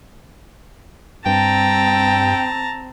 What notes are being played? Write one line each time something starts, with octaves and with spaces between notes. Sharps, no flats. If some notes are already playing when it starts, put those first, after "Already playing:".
G2 C4 G5 A5 A#5